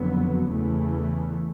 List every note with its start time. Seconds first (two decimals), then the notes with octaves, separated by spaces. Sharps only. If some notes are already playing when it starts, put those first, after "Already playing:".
Already playing: F#1 F2 D3 F#3 B3
0.49 E2 C#3 E3 A3